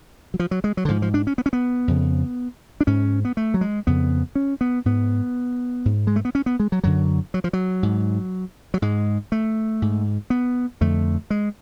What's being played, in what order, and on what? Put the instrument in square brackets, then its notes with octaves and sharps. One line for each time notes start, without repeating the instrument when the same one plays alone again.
[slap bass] F#3
F3
F#3
G#3
F#3
D3
G#2 F3
F3
D4
C#4
B3
C#4
B3
F2 C#3
D4
G#2 C#4
B3
A3
F#3
G#3
F2 C#3 B3
C#4
B3
G#2 B3
G#2
G#3
A3
B3
C#4
B3
G#3
F#3
F#2 D3 F#3
F#3
F3
F#3
G#2
F#3
G#2 G#3
A3
G#2
B3
F2 D3 A3
G#3